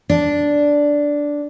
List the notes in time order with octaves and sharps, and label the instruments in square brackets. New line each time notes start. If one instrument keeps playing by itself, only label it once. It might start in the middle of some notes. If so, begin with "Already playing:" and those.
[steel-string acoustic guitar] D4